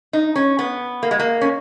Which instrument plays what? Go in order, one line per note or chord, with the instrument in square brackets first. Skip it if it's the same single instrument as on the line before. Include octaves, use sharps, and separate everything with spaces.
[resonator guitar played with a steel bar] D#4
C#4
B3
A#3
G#3
A#3
C#4